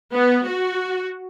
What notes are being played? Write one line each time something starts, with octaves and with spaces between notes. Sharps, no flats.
B3
F#4